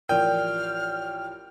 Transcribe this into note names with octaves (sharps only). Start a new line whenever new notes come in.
A1 F3 A#4 D5 G5 F6